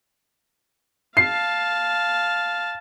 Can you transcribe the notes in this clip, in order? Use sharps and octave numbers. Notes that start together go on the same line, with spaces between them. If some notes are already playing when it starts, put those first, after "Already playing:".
F5 A5 C7